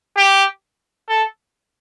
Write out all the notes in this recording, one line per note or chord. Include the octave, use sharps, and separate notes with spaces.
G4
A4